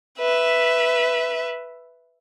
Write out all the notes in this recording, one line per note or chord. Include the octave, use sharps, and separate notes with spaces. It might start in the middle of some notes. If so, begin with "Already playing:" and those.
B4 E5